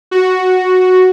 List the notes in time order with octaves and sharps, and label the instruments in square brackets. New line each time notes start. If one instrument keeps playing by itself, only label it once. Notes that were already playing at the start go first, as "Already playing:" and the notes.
[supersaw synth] F#4